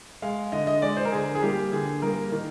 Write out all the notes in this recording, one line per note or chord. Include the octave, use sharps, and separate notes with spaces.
G#3 F5
D3 D#5
D#5
G#3 D5
C5
A#4
D3 G#4
G#4
G3 A#3 G4
D3 G#4
G3 A#3 A#4
D#3